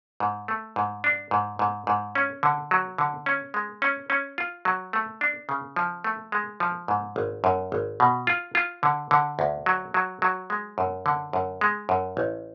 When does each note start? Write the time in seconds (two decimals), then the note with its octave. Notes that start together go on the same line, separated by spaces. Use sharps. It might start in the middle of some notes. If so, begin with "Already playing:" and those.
0.20 G#2
0.48 A3
0.76 G#2
1.04 D4
1.31 G#2
1.59 G#2
1.87 G#2
2.15 C#4
2.43 D3
2.71 F#3
2.98 D3
3.26 C#4
3.54 G#3
3.82 C#4
4.10 C#4
4.38 F4
4.65 F#3
4.93 A3
5.21 D4
5.49 C#3
5.76 F3
6.04 A3
6.32 G#3
6.60 F3
6.88 G#2
7.16 G#1
7.44 F#2
7.72 G#1
8.00 B2
8.27 F4
8.55 F4
8.83 D3
9.11 D3
9.39 D2
9.66 F#3
9.94 F#3
10.22 F#3
10.50 G#3
10.78 F#2
11.06 D3
11.33 F#2
11.61 G#3
11.89 F#2
12.17 A1